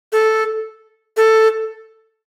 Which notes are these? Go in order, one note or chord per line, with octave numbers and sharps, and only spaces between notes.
A4
A4